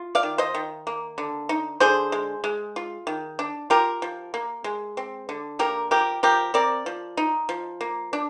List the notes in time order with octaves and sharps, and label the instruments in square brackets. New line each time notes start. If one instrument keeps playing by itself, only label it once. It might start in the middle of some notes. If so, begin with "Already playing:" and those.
Already playing: [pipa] F4
D5 F5
D#3
C5 D#5
D#3
A#3
D3
D#4
D3 G#4 C5
G#3
G#3
F4
D#3
D4
F4 G4 A#4
F3
A#3
G#3
C4
D3
A#3 G4 A#4
F3 G4 A#4
F3 G4 A#4
C4 A#4 D5
F3
D#4
F3
A#3
D4